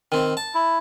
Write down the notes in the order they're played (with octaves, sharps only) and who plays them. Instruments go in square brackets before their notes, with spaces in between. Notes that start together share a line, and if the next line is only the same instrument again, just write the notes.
[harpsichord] D#3 C4
A5
[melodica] E4